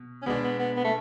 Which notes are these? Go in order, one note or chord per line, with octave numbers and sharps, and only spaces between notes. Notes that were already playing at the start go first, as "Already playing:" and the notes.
Already playing: B2
C#4
B2 G#3 B3 D4
B3
B3
B3
A3